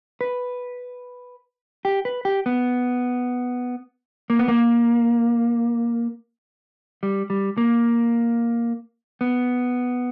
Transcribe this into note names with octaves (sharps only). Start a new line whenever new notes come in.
B4
G4
B4
G4
B3
A#3
B3
A#3
G3
G3
A#3
B3